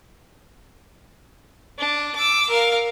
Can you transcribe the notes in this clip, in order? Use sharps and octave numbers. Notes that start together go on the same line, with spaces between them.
D4
D6 E6
A#4 F5